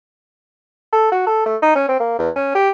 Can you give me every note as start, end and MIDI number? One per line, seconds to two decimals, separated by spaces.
0.93 1.10 69
1.12 1.25 66
1.27 1.46 69
1.46 1.56 57
1.62 1.74 63
1.75 1.86 61
1.89 1.98 60
2.00 2.15 58
2.19 2.30 40
2.36 2.51 61
2.55 2.70 67